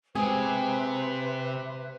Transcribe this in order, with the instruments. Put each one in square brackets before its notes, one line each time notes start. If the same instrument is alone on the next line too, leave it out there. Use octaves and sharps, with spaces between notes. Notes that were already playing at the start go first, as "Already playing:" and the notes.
[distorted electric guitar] C3 [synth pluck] G#3 [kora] G#4 [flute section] B4 C5 E5